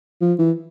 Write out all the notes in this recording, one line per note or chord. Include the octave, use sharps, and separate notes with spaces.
F3
E3